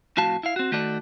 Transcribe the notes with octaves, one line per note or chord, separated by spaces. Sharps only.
F2 A2 F#4 F5 A5
E4 F5
C4 F#4
D#3 A3 F#4 A4 D5